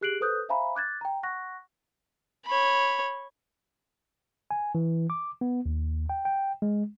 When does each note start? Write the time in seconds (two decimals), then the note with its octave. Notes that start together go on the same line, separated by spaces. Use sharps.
0.01 G4 G#4 F#6 C7 D7 F#7
0.21 A4 B4 C5 D#6 F#6 G6
0.49 C5 E5 F5 G#5 A#5 B5
0.75 D6 F#6 G#6 A6
1.01 G5 A#5
1.23 F#5 C#6 F#6 A#6
2.46 C#5 B5
4.51 G#5
4.75 E3
5.10 D6
5.41 B3
5.66 D#2
6.09 G5
6.25 G5
6.62 G#3